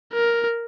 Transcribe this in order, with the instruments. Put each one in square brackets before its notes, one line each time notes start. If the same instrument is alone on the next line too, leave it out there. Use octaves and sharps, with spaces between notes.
[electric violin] A#4